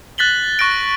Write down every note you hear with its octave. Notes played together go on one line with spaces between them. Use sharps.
F#6 A6 B6 F#7 G7
C#6 F#6 A#6 D7